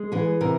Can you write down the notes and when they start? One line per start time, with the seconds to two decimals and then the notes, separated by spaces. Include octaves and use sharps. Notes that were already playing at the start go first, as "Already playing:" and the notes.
Already playing: G#3
0.12 E3 G#4
0.41 C3 A#4